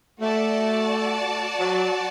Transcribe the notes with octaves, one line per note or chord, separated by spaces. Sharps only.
A3 F#4 D5 A5
F#3